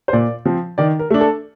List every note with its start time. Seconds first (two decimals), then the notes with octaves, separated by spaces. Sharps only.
0.08 C5
0.13 A#2 D5
0.45 F3 C4
0.78 D#3 D5
0.99 A#4
1.10 A3 D4
1.21 A4